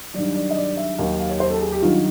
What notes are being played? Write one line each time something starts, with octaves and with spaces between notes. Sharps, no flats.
G2 D#3 F#3 D5
D5
D#5
D5
E5
D#2 D#3 F#3 F5
F5
C#5
C5
A4
G#4
G4
G2 D#3 F#3 F4